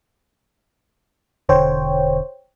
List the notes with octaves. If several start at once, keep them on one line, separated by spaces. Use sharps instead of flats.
E1 D3 C5 C#5 G5